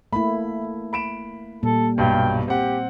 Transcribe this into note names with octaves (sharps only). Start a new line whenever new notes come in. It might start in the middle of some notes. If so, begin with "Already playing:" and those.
A3 A#3 E4 B5
B5 D7 E7
A#2 G3 A4
B1 G2 G5
C4 G4 F#5